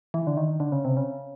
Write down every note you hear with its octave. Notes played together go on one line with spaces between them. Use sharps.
E3
D3
D#3
D3
C#3
C3
C#3